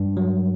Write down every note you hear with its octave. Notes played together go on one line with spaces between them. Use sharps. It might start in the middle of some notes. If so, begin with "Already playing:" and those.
Already playing: G2
F#3